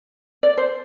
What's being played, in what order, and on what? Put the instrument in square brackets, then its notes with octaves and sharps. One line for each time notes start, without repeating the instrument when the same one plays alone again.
[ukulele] D5
C5